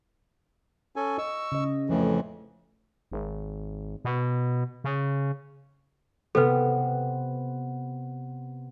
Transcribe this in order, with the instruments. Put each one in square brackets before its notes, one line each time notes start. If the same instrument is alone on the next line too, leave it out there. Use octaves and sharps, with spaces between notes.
[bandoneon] C#4 A4 G#5
[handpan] D#5 [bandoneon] C#6 E6
[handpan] C#3 D#5
[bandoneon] F2 A2 E3 [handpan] F3 A3
[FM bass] G#1
B2
C#3
[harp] C3 B3 [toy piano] A4 B4